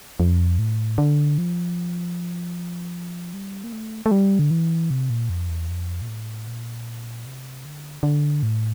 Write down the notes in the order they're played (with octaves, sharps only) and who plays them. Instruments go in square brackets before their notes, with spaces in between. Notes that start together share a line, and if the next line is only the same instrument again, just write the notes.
[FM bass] F2
A2
D3
F3
G3
A#3
A3
A3
G3
D3
E3
C3
A#2
F2
E2
F2
A#2
A2
A#2
C3
D3
D3
A2